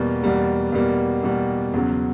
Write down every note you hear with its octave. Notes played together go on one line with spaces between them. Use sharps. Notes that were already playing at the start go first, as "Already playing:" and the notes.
Already playing: E2 B2 G3 A#3
E2 B2 G3 A#3
E2 B2 G3 A#3
E2 B2 G3 A#3
E2 C#3 F#3